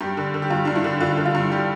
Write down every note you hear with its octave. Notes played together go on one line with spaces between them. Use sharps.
G2 G4
D3
D3
G4
G2 F4
G2 D4
E4
D3
D3 F4
D3
F4
G2
G4